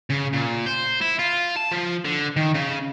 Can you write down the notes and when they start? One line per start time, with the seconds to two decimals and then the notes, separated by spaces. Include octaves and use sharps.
0.10 C#3
0.33 A#2
0.66 C5
1.01 E4
1.19 F4
1.57 A5
1.72 F3
2.05 D3
2.36 D#3
2.55 C#3